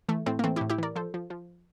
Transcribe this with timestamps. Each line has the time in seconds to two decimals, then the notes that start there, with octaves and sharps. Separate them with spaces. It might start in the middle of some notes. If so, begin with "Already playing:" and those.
0.09 E3 A3
0.26 A2 A3 C4
0.39 A#3
0.44 E3 A3 C4
0.56 E4 G4
0.61 A2
0.70 E4 G4
0.78 E3 A#4 D5
0.96 F3 A4 C5
1.14 F3
1.30 F3